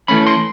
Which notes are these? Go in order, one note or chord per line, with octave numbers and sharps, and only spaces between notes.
E3 A3 C#4 B5
C6